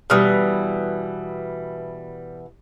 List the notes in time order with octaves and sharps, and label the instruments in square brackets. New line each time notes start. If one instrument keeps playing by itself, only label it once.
[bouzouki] B2 E3 [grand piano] G3 D#6 F6